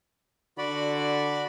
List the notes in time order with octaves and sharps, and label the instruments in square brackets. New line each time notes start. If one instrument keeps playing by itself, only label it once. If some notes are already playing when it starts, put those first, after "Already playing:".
[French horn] D3 [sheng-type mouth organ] F#4 D5 B5